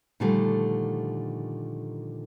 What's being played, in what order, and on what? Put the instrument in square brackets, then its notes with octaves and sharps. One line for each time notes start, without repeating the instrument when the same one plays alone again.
[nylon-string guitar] A#2 D3 D#3 F3 G3 A3